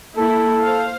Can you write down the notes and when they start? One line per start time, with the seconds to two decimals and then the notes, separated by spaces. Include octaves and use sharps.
0.17 A#3 E4 A4
0.62 C5 F5